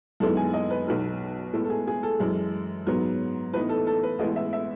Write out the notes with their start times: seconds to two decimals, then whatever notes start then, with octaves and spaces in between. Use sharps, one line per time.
0.20 F#2 D#3 G#3 B3 E4 A4
0.37 G#5
0.54 D#5
0.71 B4
0.87 B1 B2 F#3 B3 D#4
1.53 A2 G#3 B3 E4 A4
1.64 A4
1.70 G#4
1.87 G#4
2.03 A4
2.20 F#2 E3 G#3
2.87 G#2 F#3 B3
3.53 A2 E3 B3 D#4 B4
3.69 A4
3.87 A4
4.03 B4
4.19 A1 A2 G#3 B3 E4 D#5
4.36 E5
4.53 E5